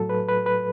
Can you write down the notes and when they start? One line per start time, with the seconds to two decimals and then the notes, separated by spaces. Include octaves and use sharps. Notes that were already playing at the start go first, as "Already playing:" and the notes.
Already playing: A2 F#3 A4
0.09 B4
0.28 B4
0.46 B4